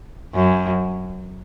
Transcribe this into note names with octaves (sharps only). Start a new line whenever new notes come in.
F#2